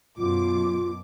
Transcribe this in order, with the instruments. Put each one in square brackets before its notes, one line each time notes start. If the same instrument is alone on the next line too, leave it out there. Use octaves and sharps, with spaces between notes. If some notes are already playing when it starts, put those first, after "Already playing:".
[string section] F#2 B2 D6 [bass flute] F4